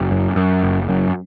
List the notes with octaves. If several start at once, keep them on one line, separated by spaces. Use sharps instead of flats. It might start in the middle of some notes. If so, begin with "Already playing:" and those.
Already playing: F#1
F#2
F#2
F#1
F#2